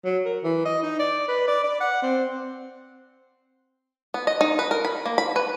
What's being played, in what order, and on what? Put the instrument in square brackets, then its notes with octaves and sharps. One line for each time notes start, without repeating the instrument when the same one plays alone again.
[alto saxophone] F#3
A#4
E3
D#5
D#4
D5
B4
D5
D5
F#5
C4
[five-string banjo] B3
D#5
D#4
B4
A#4
B5
A#3
B5
B4